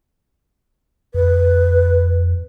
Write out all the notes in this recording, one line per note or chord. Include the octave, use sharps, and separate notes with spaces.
F2 B4